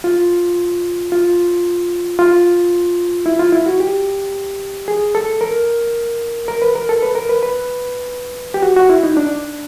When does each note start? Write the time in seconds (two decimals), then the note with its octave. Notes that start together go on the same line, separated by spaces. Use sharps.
0.04 F4
1.12 F4
2.19 F4
3.26 E4
3.39 F4
3.52 E4
3.66 F#4
3.80 G4
4.88 G#4
5.15 A4
5.41 A#4
6.48 A#4
6.62 B4
6.75 A#4
6.89 A4
7.02 B4
7.15 A#4
7.29 B4
7.43 B4
8.54 G4
8.62 F#4
8.76 F#4
8.90 E4
9.03 D#4
9.17 D4